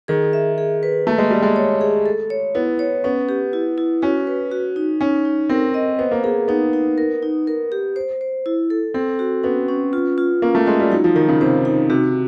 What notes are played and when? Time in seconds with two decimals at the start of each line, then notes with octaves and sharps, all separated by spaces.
0.08 D#3 G#4
0.33 E5
0.58 G#4
0.83 B4
1.07 A3 A#3
1.18 G#3
1.31 G3 A#3
1.42 G#3
1.56 C#5
1.81 G#4
2.06 A4
2.30 C#5
2.55 B3 E4
2.79 C#5
3.04 B3 C#4
3.29 G4
3.53 E4
3.78 E4
4.02 C#4 F#4
4.27 B4
4.51 F#4
4.76 D#4
5.01 C#4 D#4
5.25 D#4
5.49 C4 A#4
5.74 D#5
5.99 B3 C5
6.11 A#3
6.24 A#3 G#4
6.48 B3 D#4
6.73 D#4
6.98 A#4
7.23 D#4
7.47 A#4
7.72 G4
7.96 C5
8.21 C5
8.46 E4
8.70 A4
8.94 C4 A4
9.19 F#4
9.43 B3 C#4
9.68 C#4
9.93 F4
10.18 F4
10.42 A#3 C#4
10.55 A3
10.67 G#3 F4
10.80 G3
10.91 F#3 D#4
11.04 F3
11.16 D#3 D#4
11.28 C#3
11.41 C3 C5
11.65 D#4
11.89 C3 F#4